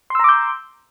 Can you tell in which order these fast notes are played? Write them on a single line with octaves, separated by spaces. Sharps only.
C6 E6 A#5 D6 G6